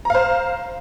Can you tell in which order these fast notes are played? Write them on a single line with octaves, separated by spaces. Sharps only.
A#5 F5 C5